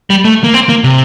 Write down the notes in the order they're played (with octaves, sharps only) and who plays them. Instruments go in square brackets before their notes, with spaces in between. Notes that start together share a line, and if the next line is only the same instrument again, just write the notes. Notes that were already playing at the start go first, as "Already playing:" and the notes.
[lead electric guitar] G3
A3
A#3
C4
A#3
C3